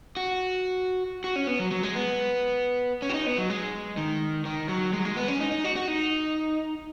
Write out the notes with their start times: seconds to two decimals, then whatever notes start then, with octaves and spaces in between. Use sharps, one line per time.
0.17 F#4
1.24 F#4
1.36 C#4
1.47 B3
1.60 F#3
1.71 F#3
1.83 G#3
1.95 B3
3.02 C#4
3.09 F#4
3.14 D#4
3.26 B3
3.38 F#3
3.50 G#3
3.97 D#3
4.45 D#3
4.69 F#3
4.93 G#3
4.99 F#3
5.05 G#3
5.16 B3
5.28 C#4
5.40 D#4
5.52 D#4
5.64 F#4
5.76 F#4
5.88 D#4